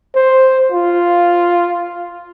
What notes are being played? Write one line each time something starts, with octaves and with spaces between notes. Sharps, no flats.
C5
F4